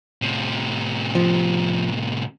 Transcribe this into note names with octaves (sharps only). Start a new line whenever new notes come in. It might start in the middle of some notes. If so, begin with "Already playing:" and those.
A2 C3
F3